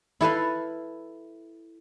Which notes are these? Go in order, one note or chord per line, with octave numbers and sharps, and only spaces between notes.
E4 A4 B4 F5